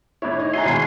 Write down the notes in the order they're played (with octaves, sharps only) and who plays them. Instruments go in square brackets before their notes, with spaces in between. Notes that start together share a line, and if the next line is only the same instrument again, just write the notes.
[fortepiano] A2 D4 E4 [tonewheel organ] C#5
[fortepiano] D#4
[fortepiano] E4 F#4 A#5 [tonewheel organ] G#5 C6
[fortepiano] D#2 B2 G#3